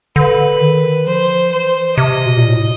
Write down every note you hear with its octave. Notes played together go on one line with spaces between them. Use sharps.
D3 B4
D#3
F3 C5
E3 C5
C3 D#5
B2
A#2
A2